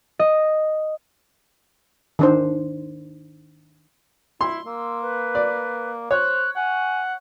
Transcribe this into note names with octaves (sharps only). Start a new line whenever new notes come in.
D#5
D#3 D4 C5
E4 C6
A#3 E6
B4
D5
C5 C#5 F#6
F#5 G#5